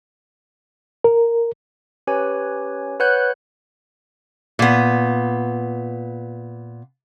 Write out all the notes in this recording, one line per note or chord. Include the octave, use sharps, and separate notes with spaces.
A#4
C#4 G4 B4 C#5 G#5
B4 C#5 F#5 F#6 G6
A#2 B3